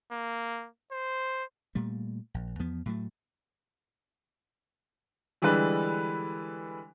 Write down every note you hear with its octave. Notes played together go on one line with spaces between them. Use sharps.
A#3
C5
A#2 G3 A3
A#1
E2 F3 B3
A2 F#3 A3
D3 E3 G3 G#3 B4